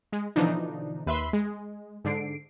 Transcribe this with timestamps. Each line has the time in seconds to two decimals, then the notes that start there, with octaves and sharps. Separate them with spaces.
0.12 G#3
0.36 B2 D3 E3 F3 D4 D#4
1.06 D#2 B4 E5 B5 C6
1.33 G#3
2.04 G#2 D3 C7 D7